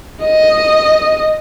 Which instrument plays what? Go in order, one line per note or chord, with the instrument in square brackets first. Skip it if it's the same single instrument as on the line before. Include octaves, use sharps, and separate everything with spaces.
[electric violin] D#5